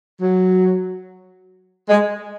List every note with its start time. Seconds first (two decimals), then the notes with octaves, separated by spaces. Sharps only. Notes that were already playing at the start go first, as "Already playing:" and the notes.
0.21 F#3
1.89 G#3